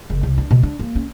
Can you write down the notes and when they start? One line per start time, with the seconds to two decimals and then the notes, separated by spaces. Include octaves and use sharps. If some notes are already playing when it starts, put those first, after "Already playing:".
0.10 F#1
0.23 C2
0.38 D4
0.51 B2
0.63 D4
0.79 A#3
0.95 C#4